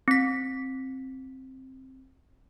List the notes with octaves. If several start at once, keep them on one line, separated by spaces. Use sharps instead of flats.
C4 B6